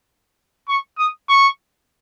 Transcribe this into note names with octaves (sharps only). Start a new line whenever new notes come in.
C#6
D#6
C#6